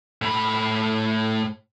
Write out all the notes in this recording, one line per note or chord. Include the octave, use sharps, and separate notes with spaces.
A2 B5